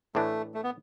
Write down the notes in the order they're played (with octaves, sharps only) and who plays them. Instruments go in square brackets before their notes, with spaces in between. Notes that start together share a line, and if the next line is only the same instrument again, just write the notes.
[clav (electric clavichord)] A2 E3 D4 [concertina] A3
[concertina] A3
B3